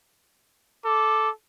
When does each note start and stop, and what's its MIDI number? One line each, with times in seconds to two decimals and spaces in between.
0.85 1.31 69
0.85 1.29 86